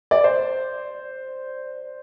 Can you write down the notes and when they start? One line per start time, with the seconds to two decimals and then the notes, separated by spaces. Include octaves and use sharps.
0.11 D5
0.24 C5